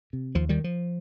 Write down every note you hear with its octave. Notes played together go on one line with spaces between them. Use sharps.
C3
D#2 F3
D#3 G3
F3